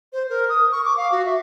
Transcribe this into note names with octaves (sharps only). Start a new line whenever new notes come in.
C5
A#4
D#6
C#6
D6
F5
F#4
E5